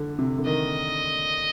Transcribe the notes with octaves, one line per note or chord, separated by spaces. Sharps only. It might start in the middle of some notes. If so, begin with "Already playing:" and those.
Already playing: D3
C3
D3
D#3 D#5